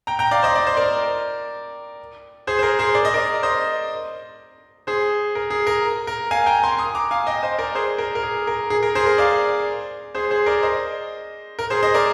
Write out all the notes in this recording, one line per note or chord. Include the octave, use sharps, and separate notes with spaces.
G5 A#5
G5 A#5
D5 F5
C5 D#5
D5
C5
A#4 D5
G#4 C5
C5
A#4
G#4 C5
D5
D#5
A#4 D5
C5 D#5
G#4 C5
A#4
G#4
A#4
A#4
F5 G#5
G5 A#5
G#5 C6
C6 D#6
A#5 D6
F5 G#5
D#5 G5
C5 D#5
A#4 D5
G#4 C5
A#4
A#4
G#4
A#4
G#4
A#4
G#4 C5
A#4
D5 F5
G#4 C5
G#4 C5
A#4 D5
C5 D#5
A#4
G#4 C5
C5 D#5
A#4 D5